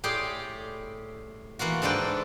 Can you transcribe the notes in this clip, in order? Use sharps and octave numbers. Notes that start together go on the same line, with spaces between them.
A2 G4 G#4 D5 C6
E3 A#3 F4 F#4
G#2 G#3 D4 A4 B4 G5